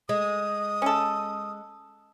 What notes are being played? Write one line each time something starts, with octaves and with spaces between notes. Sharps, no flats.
G#3 D#6
C#4 A4